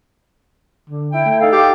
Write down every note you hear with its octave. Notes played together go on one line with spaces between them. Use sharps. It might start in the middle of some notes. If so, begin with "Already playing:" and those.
D3
E4 G5
A3
D#4 A4 F5
G4